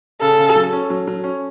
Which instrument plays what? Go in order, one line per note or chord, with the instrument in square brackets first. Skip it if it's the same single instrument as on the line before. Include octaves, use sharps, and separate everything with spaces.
[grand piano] C#3 [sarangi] A4
[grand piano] C#3
F#3
C#4
F#3
F#3
C#4